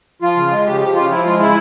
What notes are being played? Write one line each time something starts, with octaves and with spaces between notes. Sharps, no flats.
F3 F4
C#3
G#3
C#3 G4
F3 G4
C#3 F4
F3 E4
G#3 F4
C#3 E4